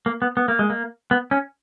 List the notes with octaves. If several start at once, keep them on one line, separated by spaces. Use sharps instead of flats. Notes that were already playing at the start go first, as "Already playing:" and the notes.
A#3
B3
B3
A#3
G#3
A#3
B3
C#4